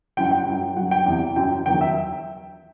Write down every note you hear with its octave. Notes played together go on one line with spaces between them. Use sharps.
F#2 E3 G5
F#5
G5
F#2 F#3
F#2 F#3 F#5
G5
E2 C3 E3
F#2 F#3 G5
E2 D#3 F#3 G5
E5